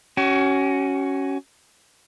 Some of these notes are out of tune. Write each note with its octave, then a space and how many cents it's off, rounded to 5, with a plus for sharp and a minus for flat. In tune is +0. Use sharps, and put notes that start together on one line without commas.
C#4 +0 F#4 +30